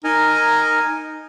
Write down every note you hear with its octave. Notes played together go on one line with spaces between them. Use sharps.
D#4 A#4 D#5 G#5